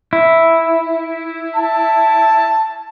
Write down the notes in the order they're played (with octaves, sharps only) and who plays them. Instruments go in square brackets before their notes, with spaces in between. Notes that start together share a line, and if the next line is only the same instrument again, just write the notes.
[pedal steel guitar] E4
[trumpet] A5